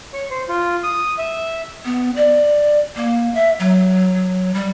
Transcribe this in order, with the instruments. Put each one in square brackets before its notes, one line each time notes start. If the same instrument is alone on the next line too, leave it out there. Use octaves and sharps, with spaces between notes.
[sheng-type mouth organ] C#5
C5
F4
D#6
E5
[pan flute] B3
D5
A#3
E5
F#3
G3